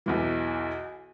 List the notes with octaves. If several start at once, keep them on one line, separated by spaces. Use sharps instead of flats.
B1 E2 E3